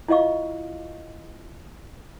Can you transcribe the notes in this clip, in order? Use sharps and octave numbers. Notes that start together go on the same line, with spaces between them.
E4 F4 D#5 F5 C#6